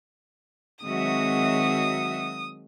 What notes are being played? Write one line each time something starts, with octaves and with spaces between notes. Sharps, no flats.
D#3 F#3 G#3 C4 F#4 E5 D#6